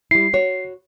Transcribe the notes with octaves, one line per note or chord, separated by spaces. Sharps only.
G3 E4 C7
F#4 C#5